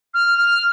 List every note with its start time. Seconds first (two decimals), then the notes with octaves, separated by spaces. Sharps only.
0.14 F6
0.38 F6